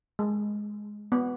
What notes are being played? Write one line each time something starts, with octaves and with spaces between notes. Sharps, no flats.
G#3
B3